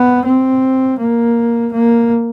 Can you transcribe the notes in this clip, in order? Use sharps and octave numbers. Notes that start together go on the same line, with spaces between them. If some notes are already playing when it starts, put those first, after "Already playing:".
Already playing: B3
C4
A#3
A#3